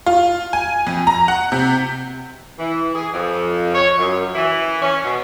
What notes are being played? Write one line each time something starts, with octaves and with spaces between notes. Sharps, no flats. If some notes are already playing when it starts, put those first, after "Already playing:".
F4
G#5
F2
A#5
F#5
C3
E3
G#4
F2
C#5
F#2
E3
C#4
B2